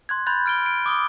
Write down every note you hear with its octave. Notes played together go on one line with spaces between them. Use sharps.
C6 F#6 G#6
B5 C6 F#6 G6 A6
F6 D7 G7
D7
D6 D#6 G7